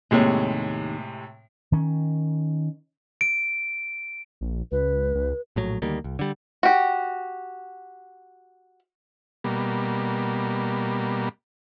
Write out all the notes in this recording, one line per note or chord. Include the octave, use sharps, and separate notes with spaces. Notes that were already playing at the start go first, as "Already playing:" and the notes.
D#2 A2 C3 G#3 C#5
D#3 C#4
D7
A#1
C#2 B4
C#2
A#1 A2 F#3
D2 D#3 G3 A#3
C2
D3 G3
F#4 G4
B2 G3 A#3